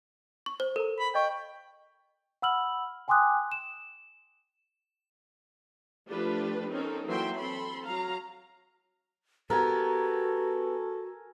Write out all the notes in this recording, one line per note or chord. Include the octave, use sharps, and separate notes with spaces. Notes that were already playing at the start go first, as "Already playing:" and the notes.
C#6
C5
A4 A#4 A#5
B5
D#5 F5 G5 C#6
F#5 B5 E6 F6 F#7
G5 G#5 C6 D6 D#6 F#6
E7
F3 A3 D4 F4 G4 B4
C4 C#4 D#4 A4 A#4
E3 F#3 A#3 E5 G5 C6
C4 A4 B5 C6
F#3 F5 A#5
B3 F#4 G4 A4 A#4 G#5